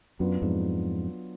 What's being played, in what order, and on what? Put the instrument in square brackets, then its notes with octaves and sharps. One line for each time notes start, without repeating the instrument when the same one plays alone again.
[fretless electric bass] F#2 [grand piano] F#3 B3 D4 F4 B4
[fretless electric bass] F2 G#2